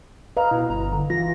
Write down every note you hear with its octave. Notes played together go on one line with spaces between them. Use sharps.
B4 D#5 F5 A#5
B2 E4
G1 A#5
D3
E3 F4 A#6